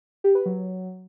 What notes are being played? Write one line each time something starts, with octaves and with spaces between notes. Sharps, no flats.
G4
B4
F#3